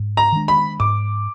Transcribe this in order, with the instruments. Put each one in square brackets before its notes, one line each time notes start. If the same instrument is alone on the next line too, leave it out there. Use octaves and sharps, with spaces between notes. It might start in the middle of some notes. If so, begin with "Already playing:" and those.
Already playing: [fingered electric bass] G#2
[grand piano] A#5
[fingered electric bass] D#3 G#3 D4
[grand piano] B5
[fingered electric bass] G#2 [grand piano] D6